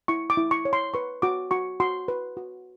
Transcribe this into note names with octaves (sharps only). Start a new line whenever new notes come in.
E4 C#6
D6
E4
C#6
C#5
C6
B4 C#6
F#4 D6
F#4 C#6
F#4 C6
B4
F#4